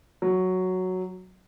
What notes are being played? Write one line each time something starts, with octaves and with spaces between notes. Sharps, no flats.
F#3